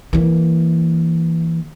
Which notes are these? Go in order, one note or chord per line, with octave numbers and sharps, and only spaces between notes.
E3 A#3